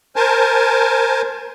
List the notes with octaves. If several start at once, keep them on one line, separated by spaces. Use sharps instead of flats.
A#4 C5 G#5 A5